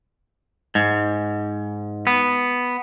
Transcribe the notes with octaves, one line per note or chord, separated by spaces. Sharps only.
G#2
B3